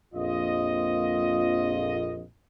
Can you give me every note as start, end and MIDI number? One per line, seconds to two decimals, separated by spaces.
0.14 2.22 34
0.14 2.22 41
0.14 2.22 65
0.14 2.22 75